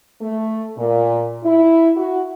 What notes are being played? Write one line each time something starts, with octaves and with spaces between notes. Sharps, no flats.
A3
A#2
E4
F#4